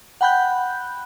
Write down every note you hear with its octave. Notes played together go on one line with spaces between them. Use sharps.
F#5 G5 B5 F#6 G6